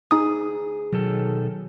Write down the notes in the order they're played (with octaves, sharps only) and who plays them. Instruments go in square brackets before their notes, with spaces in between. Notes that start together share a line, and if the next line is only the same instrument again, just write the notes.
[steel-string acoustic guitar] D2 G#4 [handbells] D#4 D#6
[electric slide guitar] B2 D#3 A4 [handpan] F#3